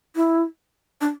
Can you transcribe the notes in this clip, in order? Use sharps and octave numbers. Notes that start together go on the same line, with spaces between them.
E4
D4